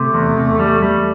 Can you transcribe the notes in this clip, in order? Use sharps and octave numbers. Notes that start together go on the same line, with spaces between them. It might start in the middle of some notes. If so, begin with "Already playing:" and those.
Already playing: C3 A3
E2
E2
G3
G3